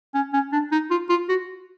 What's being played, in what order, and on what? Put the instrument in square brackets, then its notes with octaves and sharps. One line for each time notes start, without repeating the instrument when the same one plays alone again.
[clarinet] C#4
C#4
D4
D#4
F4
F4
F#4